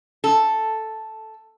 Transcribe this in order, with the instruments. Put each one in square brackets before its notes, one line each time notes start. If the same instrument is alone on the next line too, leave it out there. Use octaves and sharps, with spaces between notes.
[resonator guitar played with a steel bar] A4